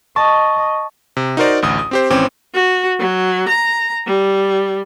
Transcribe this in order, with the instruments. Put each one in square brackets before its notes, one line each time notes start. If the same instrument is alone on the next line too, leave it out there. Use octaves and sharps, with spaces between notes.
[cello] D#5 [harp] A5 [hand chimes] C#6
[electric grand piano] C3
D#4 F#4 A#4 C5 D5
A1 D2 D#6
D#6
C4 G4 C5
G#1 E3 C4 C#4 G5 D6
[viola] F#4
F#3
A#5
G3